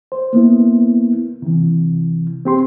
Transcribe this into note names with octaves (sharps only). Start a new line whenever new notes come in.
C5
A#3 B3 E4
C3 E3
C4 G4 C6